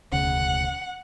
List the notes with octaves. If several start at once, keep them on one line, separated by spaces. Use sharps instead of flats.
E1 D2 C#3 F#5